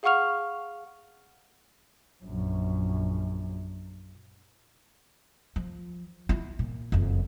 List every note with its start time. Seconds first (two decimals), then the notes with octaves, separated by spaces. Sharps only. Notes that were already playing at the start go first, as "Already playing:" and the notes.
0.03 G#4 F5 F#5 C#6 F6 F7
2.24 A#1 F#2
5.56 F3
6.29 E4 F4
6.59 A#2
6.92 F#1 F2